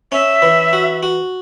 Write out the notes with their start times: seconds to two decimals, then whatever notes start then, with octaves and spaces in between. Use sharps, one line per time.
0.12 C#4 E5
0.42 E3
0.73 F#4
1.03 F#4